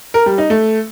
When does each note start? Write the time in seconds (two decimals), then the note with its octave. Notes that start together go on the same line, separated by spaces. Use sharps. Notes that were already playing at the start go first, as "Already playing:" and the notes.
0.14 A#4
0.26 G3
0.38 D#4
0.50 A3